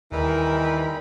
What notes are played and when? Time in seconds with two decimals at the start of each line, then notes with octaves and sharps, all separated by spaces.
0.12 D#2 E3 G3 G#3 D#4 A#4 B5